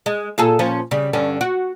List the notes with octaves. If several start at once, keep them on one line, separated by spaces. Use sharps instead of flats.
G#3
A#2 G#4 A4
A#2 F3 C#4
C#3 G3
G2 D3 C#4
F#4